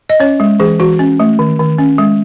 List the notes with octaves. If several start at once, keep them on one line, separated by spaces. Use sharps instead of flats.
D#5
C#4 C#5
G#3
E3 G#4
E3 F#4
C#4
A3
D#3
D#3
C#4
G#3